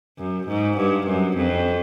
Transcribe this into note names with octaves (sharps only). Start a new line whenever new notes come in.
F#2
G#2
G2
F#2
F2